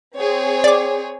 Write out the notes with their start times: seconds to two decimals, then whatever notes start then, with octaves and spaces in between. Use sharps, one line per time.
0.17 C4 G#4 C#5
0.64 D5 D6